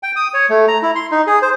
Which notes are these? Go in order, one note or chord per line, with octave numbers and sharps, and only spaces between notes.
G5
D#6
C#5
A3
A#5
E4
C6
D#4
G#4
C5